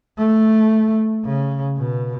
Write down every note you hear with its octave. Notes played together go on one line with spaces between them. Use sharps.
A3
C#3
B2